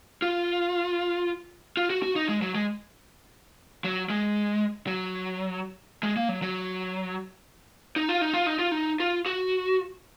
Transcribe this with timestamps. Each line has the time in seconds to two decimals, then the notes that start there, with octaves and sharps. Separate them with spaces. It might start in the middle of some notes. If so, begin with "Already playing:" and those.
0.22 F4
1.77 F4
1.90 F#4
2.03 F#4
2.16 D#4
2.29 G#3
2.42 F#3
2.55 G#3
3.84 F#3
4.10 G#3
4.87 F#3
6.03 G#3
6.16 A#3
6.29 F#3
6.42 F#3
7.96 D#4
8.09 F4
8.21 D#4
8.34 F4
8.46 D#4
8.59 F4
8.72 D#4
9.00 F4
9.26 F#4